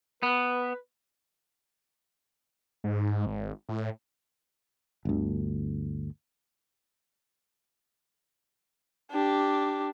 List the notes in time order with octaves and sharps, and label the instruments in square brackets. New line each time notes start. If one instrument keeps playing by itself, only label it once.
[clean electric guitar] B3 [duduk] B4
[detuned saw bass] G#2
G#1
A2
[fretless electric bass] G1 D2
[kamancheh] D4 G4